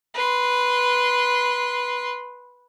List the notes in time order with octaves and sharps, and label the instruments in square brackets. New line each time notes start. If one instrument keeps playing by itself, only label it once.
[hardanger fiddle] B4 C6